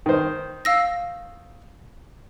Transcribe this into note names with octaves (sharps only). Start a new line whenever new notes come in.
D#3 C5
F5 E6 A#6